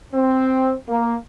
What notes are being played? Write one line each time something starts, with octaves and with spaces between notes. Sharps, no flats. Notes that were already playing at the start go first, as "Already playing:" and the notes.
C4
A#3